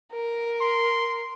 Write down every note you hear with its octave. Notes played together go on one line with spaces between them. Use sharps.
A#4
C6